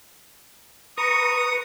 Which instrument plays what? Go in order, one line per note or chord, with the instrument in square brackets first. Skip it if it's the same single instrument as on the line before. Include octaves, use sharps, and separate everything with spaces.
[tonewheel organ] B4 A#5 C#6 [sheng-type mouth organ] D#6